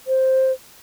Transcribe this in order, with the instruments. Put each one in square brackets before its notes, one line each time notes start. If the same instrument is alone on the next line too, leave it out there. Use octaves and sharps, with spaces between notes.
[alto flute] C5